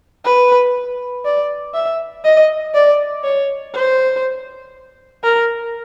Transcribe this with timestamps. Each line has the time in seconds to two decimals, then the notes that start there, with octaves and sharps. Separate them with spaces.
0.25 B4
1.25 D5
1.74 E5
2.25 D#5
2.74 D5
3.24 C#5
3.75 C5
5.24 A#4